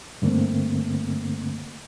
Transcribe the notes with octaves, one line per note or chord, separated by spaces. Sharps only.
G2 D3 A3 A#3 C4